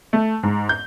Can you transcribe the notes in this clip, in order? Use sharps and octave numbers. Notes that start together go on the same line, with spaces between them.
A3
G#2
G6